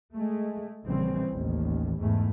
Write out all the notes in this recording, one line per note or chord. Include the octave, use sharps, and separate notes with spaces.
G#3 A3
A#1 C#3 E3 G3 C4
A1 D#2
E2 G#2 A3